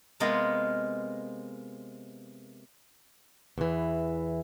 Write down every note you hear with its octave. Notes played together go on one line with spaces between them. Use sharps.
C3 G#3 A#3 B3 F4 A#4
E2 E3